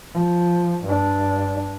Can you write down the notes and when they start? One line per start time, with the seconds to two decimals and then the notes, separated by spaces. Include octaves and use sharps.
0.14 F3
0.84 G2 D4